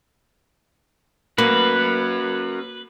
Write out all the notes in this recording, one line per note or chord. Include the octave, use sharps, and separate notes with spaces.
A#3 C#4 F#4 B4